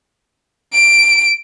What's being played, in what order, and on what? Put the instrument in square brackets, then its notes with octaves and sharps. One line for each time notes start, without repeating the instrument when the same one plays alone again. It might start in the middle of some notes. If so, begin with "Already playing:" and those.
[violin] D7